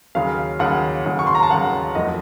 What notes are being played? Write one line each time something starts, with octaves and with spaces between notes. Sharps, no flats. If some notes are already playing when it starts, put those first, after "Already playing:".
D#2 C#3 F#3 F5
D#2 C#3 F#3 F#5
D#2 C#3 F#3
C#6
C6
A#5
A5
D#2 C#3 F#3 F#5
F2 D#3 F#3 A3 D#5